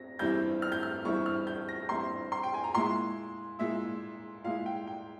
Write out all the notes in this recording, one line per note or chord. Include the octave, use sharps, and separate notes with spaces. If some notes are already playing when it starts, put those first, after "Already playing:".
Already playing: C4 A#6
G2 E3 G3 C4 E4 G6
F6
G6
F6
G2 E3 G3 C4 E4 C#6
F6
G6
A#6
G2 E3 G3 C4 E4 C6
C6
G5
G#5
A#5
A#2 G#3 E4 C6
A#2 G#3 E4 E5
A#2 G#3 E4 F5
G5
G5